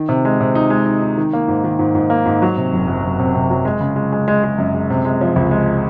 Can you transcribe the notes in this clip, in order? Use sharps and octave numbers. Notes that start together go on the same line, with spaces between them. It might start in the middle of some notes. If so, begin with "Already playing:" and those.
Already playing: D#3
C3
G#3
C3
D#4
G#3
D#4
D#4
D#3
A#3
G#2
D#3
G#2
G#2
A#3
G#2
F#3
C3
F#1
F#1
F#1
C3
C3
F#3
G#3
C#3
G#3
G#3
G#3
G#3
F#2
G#3
C3
G#3
F3
C#2
G#3